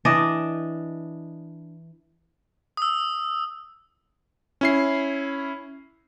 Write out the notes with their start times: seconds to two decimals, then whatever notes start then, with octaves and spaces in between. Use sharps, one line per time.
0.05 E3 D4 D5 D#5
2.77 D#6 E6
4.61 C#4 E4 C7